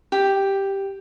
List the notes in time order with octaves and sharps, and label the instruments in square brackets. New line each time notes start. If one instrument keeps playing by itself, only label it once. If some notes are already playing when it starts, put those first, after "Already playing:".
[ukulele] G4